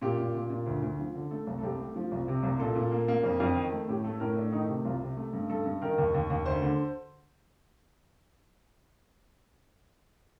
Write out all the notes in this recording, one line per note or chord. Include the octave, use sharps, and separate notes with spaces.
A#2 G4
A#2
A#2
A#2
D2
D2
F3
D3
A3 A4
C2
A4
C2 G4
A3
F3
C2
C3
C2
A#2 A4
A#2
A#3
A#3
F2
F2
D#3
A3
A2 G4
A3 A4
A2 A#4
A3 D4
D#3 D#4
C3
C2 F4
C3
A3
G2
G2 A4
G2
D#3 A#4
D#2
D#2
D#2
D2 C5
D3